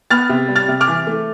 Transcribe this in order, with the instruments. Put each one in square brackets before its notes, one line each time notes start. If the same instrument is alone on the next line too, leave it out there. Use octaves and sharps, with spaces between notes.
[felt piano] B3 F6 A6
C3
G3
F6 A6
C3
D6 F6
E3
A3